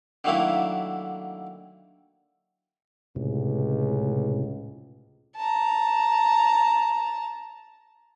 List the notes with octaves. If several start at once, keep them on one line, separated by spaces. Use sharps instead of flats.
D3 D#3 F#3 A3 A#3 E4
C#2 A2 C3
A5 A#5